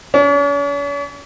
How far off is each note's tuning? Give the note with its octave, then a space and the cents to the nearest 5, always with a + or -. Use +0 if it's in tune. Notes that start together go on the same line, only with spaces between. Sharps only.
C#4 +45